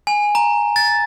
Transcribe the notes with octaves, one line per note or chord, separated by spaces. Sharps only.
G#5
A#5
A6